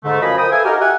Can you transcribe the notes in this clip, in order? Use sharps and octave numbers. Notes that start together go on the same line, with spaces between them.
G#2 D3 A3
F#2 F3 D#5 F5 G#5 B5
A#4 C5 G5 D#6
A4 B4 E5 F5 G#5
D#4 F#4 G4 A4 A#4
G4 E5 F#5 G#5